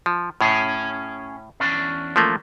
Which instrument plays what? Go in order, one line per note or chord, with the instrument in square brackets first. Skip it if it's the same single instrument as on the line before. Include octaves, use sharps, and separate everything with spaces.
[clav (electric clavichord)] F3
[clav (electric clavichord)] A2 [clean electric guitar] C#4 G#4 C#5
[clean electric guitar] E2 C#4 D4
[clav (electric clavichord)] F3 A3 A#3